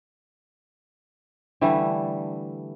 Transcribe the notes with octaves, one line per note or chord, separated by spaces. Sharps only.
D3 E3 G3 A3